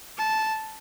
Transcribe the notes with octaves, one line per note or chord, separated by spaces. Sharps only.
A5